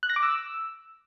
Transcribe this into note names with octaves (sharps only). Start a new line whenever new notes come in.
F#6
A#6
D6
E6